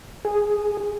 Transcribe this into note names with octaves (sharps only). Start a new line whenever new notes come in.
G#4